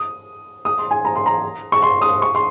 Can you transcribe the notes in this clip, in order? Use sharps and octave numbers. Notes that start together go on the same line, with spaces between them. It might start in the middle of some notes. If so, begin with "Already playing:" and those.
Already playing: D#6
D#6
C6
G#5
A#5
C6
A#5
C#6
C6
D#6
C#6
C6